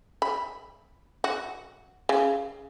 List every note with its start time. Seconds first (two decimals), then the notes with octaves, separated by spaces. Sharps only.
0.22 B5
1.24 F#4
2.09 C#3